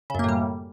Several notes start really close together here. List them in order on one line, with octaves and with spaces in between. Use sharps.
C#3 F#2 A#3 A2 G3